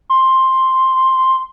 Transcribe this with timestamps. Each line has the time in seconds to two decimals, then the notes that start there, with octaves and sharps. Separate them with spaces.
0.10 C6